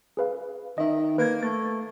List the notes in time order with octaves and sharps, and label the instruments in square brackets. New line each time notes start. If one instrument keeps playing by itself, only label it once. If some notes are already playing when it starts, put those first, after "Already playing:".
[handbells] G#4 B4 F5
[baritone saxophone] D#3 [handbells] D#5 E5
[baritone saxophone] A#3 [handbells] B4 G#6
[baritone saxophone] A3 [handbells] A6